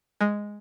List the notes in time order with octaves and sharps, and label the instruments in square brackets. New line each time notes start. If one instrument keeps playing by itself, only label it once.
[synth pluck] G#3